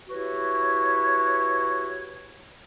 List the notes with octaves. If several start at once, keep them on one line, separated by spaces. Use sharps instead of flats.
E4 F#4 G4 B4 C#5